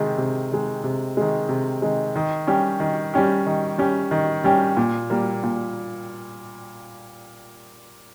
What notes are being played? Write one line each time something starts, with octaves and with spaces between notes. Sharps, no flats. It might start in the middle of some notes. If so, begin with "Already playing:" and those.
Already playing: C3 D#3 G#3
C3
D#3 G#3
C3
D#3 G#3
C3
D#3 G#3
D#3
G3 C#4 G4
D#3
G3 C#4 G4
D#3
G3 C#4 G4
D#3
G3 C#4 G4
A#2
G3 A#3
A#2